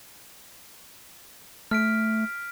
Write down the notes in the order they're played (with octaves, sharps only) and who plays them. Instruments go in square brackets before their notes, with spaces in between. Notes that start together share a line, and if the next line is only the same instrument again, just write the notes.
[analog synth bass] A3 [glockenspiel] F6 B6 D7